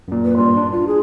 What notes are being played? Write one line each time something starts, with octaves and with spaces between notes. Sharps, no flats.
F#2 A#2
B4
G2 A#2 G3 C6
D4
F4
G#4